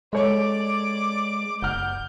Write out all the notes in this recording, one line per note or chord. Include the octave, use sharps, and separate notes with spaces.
G#3 A4 C#5 D5 D6
F#1 F#5 F6 G6